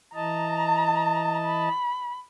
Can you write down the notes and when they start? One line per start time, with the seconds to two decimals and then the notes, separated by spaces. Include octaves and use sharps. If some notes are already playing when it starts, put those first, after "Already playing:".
0.15 E3 D#5 A5 A#5
1.44 B5